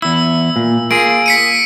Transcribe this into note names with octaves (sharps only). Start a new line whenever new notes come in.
E2 E4 E6
A#2
A#3 F4 G#4 D7
B6 C#7 D#7